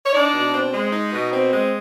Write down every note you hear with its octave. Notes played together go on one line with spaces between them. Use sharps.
C#5
D4 D#4 D5
B2
C4
G#3
D#4
B2
C4
G#3